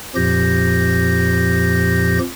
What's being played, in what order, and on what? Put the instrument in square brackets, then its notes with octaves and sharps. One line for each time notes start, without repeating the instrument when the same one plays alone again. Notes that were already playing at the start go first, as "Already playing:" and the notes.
[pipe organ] F2 A#2 F3 G4 G6 A#6